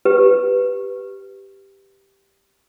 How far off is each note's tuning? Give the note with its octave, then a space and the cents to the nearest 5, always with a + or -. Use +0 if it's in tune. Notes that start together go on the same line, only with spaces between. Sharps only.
G4 +0 B4 +0